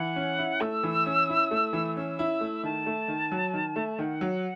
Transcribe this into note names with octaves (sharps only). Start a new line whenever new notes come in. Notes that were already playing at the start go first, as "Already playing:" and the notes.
Already playing: E3 F#5
C#4
E4
A3 E6
E3
C#4
E4
A3
E3
C#4 E6
E4
A3
D#3 A5
A3
D#3
F#3
D#3
A3
D#3 F#5
F#3